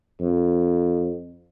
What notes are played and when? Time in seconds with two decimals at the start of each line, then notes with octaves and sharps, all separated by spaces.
0.20 F2